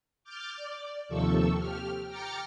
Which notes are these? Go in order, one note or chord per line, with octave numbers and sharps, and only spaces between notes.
D6 F6 G6 A6
D5
D#2 C3 F3 A4 C#6 E6
G4 F6
G5 A#5 D6 F6 A6 C#7